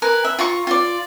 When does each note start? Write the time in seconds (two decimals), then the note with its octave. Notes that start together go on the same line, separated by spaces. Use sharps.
0.02 A#4 B4 G#5
0.25 E5
0.39 F4 A#5 C#6
0.67 F4 D5